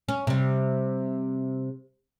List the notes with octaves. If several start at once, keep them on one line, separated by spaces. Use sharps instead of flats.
C#4
C3 G3